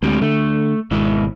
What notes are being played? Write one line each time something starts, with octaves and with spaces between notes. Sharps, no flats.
D2 G#3 C4 G4
D3 A3
G#1 B2 G#3 E4